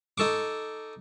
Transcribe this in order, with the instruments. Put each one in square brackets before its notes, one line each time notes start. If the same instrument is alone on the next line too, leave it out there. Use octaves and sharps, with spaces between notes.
[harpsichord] D#4 A4 C#6 D6